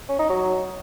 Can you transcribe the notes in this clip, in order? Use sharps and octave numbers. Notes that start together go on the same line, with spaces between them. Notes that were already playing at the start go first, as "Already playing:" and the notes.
C#4
D#4
F#3